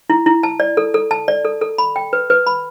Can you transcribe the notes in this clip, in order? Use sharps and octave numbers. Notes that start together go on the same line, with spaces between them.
E4
E4
A5
D5
A4
A4
A5
D5
A4
A4
B5
G5
B4
B4
B5